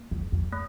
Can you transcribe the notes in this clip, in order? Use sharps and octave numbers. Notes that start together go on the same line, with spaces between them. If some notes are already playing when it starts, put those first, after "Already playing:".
Already playing: A#3
E2
F2
A3